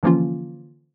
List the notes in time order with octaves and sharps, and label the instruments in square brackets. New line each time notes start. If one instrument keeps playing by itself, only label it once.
[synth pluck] D3 E3 F3 A#3 C#4 F4